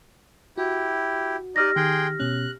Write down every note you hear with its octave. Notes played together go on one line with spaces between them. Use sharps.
E4 F#4 G4
D#4 G4 D5 D#5 F6 A#6
D#3 G#4 G5 C6 F#6
B2 C#4 F#6